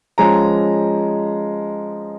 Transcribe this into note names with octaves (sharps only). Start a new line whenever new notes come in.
F3 G#3 C#4 A#5